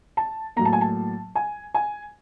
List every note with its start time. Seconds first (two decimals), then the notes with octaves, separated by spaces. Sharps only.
0.17 A5
0.56 A2 F#3 A#3 A#5
0.65 A5
0.73 G#5
0.81 A5
1.35 G#5
1.74 G#5